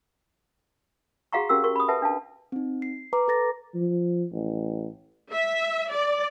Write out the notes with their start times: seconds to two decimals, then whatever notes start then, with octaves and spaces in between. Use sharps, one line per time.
1.33 F#4 G#4 F5 F#5 A#5 C#6
1.49 C#4 F#4 G4 A#4 C#5 E6
1.64 F#4 A#4 C#6
1.76 B5 D#6
1.88 A4 B4 E5 F#5 A5
2.02 D4 F5 A5
2.52 C4 D#4
2.82 C7
3.13 B4 A#5 D6
3.28 A4 B4 A6 A#6
3.75 F3
4.32 A1
5.33 E5
5.92 D5